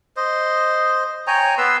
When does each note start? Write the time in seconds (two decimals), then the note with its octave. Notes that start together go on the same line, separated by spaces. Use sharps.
0.17 C5 D#5
1.27 C#5 G5 G#5 A#5
1.58 B3 B4 C6 E6